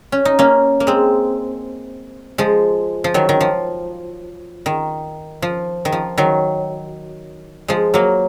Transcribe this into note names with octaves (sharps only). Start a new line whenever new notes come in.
C#4
D#4
A#3 C#4
A#3
G#3 C4
F3 G#3
F3
D#3 F#3
D#3
F3
D#3
F3
D#3
F3
D#3 F#3
F3 G#3
F#3 A#3